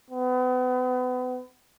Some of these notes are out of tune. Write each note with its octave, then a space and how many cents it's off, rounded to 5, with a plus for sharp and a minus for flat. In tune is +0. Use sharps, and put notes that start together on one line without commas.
B3 +35